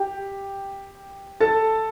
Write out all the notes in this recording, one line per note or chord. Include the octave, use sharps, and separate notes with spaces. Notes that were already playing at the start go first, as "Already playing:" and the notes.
Already playing: G4 G5
A4 A5